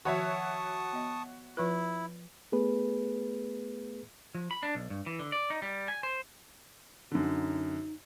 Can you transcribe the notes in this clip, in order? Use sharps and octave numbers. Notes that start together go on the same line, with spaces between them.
D#3 F3 F#4 C#5 E5 A5 C#6 D#6
B3 D#5
F3 E4 F4 B4
A3 B3 G#4 B4
F3
B5
D4
B1
G2
E3
D3
D5
D#4
G3
G#5
C5
F#2 D3 D#4